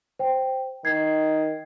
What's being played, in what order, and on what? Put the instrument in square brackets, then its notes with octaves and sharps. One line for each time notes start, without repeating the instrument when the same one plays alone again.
[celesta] C5 G5
[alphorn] D#3 [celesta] G#6 C7